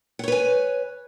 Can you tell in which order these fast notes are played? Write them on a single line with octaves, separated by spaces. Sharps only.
F#5 C#5 B4 G#5